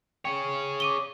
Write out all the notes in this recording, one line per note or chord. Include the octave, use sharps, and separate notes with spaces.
G#4 C#5 G5
D6 D#7 G7